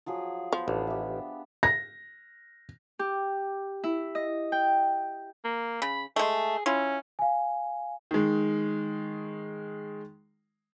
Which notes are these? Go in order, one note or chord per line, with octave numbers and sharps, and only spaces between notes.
F3 F#3 G#4
F3 B3
A1 D4
G4 E5
A#6
G4
E4
D#5
G5
A#3
C#3 B5
G#3 A3 G#4
C#4 E4 F4
F5 G#5
D#3 G#3